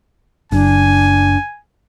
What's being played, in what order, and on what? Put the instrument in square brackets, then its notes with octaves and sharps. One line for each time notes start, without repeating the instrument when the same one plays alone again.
[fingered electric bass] F#1 [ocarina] D4 [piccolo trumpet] G#5